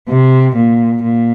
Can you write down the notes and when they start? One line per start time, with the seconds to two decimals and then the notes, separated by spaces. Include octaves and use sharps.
0.09 C3
0.56 A#2
1.03 A#2